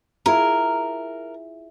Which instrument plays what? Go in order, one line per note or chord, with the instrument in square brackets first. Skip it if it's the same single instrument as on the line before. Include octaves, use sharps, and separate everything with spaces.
[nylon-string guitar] E4 F4 G#4 [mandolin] A#4